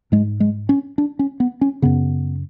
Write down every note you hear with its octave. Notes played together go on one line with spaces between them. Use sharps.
G#2 G#3
G#3
C#4
D4
C#4
B3
C#4
F#2 C#3 B3